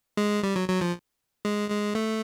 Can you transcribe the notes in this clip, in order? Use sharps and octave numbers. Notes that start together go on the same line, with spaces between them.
G#3
G3
F#3
F#3
F3
G#3
G#3
A3